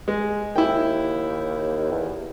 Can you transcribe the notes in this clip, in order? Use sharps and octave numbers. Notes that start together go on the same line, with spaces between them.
G#3
D#2 E4 G5
E2